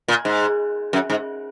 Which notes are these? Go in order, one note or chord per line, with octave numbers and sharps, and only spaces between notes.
A#2
G#2
F#2
G#2